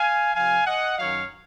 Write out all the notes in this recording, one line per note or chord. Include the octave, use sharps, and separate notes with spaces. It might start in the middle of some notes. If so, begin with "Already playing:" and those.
Already playing: F5 G#5
C3 F3 F5 G#5
D#5 F#5
F#2 D#3 F#3 C#5 F5